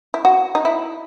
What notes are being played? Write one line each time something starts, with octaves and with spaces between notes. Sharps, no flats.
E4
F#4
D#4
E4